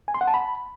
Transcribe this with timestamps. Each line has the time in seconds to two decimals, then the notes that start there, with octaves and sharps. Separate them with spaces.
0.08 G#5
0.14 C6
0.21 F#5
0.27 A5
0.34 B5